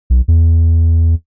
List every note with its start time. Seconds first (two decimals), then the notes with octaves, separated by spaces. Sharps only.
0.10 B1
0.28 E2